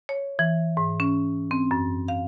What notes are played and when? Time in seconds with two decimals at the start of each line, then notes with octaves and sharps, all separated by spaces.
0.09 C#5
0.39 E3
0.77 G#2
1.00 C#4
1.51 C4
1.71 F#2
2.08 F5